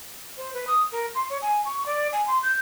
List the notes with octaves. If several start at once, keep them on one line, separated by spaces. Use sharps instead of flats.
C5
B4
D#6
A#4
C6
C#5
G#5
C#6
D5
G#5
C6
G6